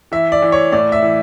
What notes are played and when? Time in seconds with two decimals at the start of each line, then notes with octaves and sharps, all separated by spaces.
0.12 E3 E5
0.32 D5
0.42 E3
0.52 C#5
0.72 A2 D5
0.92 E5
1.02 E3